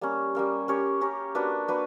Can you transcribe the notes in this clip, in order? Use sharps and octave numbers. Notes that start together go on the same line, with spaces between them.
G3 A#3 C#4
G3 A#3 C#4
C#4 G4 A#4 C#5
C#4 G4 A#4 C#5
A#3 D4 F#4 B4
A#3 D4 F#4 B4